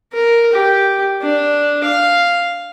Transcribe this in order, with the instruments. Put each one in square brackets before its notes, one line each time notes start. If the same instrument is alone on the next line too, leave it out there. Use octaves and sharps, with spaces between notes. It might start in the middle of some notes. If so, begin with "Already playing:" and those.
[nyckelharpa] A#4
G4
D4
F5